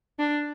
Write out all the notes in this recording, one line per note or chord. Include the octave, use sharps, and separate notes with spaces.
D4